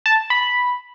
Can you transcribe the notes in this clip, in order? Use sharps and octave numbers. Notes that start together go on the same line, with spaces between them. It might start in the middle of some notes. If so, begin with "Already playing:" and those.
A5
B5